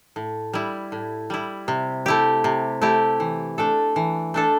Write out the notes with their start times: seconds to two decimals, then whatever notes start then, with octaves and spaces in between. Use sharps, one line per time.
0.16 A2
0.53 G3 E4
0.92 A2
1.30 G3 E4
1.68 C3
2.06 A3 E4 G4
2.44 C3
2.82 A3 E4 G4
3.20 E3
3.58 A3 D4 A4
3.96 E3
4.34 A3 D4 A4